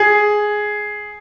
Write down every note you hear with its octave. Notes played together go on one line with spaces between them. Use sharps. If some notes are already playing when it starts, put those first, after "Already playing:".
Already playing: G#4